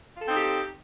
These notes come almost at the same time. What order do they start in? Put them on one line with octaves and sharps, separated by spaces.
F4 A4 C4 D#4 G4